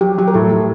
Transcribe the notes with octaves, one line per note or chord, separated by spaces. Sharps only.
F#3 G4
F#3 G4
A#4
A2 A4
A2